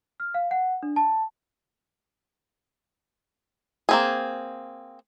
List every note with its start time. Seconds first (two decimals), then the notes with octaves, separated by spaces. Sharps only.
0.20 F6
0.34 F5
0.51 F#5
0.83 D4
0.96 A5
3.89 A#3 C4 G#4